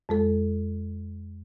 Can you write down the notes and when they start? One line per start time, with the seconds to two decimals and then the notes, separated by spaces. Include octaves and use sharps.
0.09 F2 G#3 A4